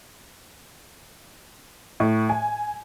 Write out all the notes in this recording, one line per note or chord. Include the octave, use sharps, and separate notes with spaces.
A2
G#5